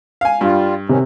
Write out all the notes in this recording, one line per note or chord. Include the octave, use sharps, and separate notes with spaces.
F5 G#5
G2 G3 F4
C3 D#3 C#4